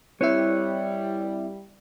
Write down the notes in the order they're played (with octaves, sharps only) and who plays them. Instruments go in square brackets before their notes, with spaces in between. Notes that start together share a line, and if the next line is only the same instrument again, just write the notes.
[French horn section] G3 [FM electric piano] C4 E4 E5 [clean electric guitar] B4 C#5